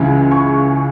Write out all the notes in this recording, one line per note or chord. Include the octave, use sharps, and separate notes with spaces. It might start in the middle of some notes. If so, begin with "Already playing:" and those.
Already playing: C#2 C#3 E3 G#3
C#6